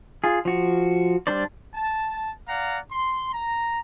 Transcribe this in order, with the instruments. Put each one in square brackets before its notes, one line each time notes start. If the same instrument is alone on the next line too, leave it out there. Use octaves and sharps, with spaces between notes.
[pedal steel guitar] F4 G#4
F3 F#4
G3 D4 C5 D5
[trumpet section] A5
D5 F5 F#5 A#5
C6
A#5